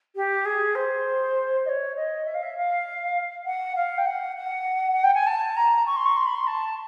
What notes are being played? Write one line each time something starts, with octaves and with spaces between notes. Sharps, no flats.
G4
G#4
C5
D#5
C#5
D#5
E5
F5
E5
F5
F#5
F5
G5
F#5
F#5
F#5
G5
G#5
A5
A#5
C#6
C6
C#6
C6
B5
C6
A5